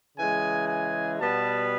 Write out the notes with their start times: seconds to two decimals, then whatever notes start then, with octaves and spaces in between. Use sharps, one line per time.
0.17 C#3 E3 G#3 G#5
0.68 G#5
1.20 B2 G3 B3 A5